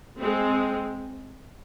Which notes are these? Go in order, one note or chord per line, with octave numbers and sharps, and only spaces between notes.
G#3 C4